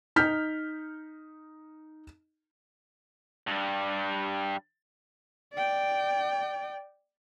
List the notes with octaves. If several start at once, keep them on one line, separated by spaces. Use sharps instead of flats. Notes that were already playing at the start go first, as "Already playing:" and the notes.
D#4 F6 G6 B6
G2 G3
D5 G5